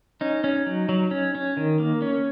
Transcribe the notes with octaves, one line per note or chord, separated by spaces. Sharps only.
C#4 D#4
C#4
F#3
F#3
C#4
C#4
D#3
A#3
C#4